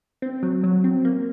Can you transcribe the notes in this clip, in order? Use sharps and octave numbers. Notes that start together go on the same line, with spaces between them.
C4
F#3
F#3
C4
A#3